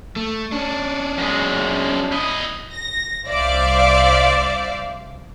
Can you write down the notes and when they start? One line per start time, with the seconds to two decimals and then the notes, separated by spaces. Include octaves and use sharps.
0.16 A3
0.52 C#4 D4
1.18 F#2 G#3
2.12 E4 D#5
2.72 A#6
3.26 C2 C5 D5 E5 F5 D6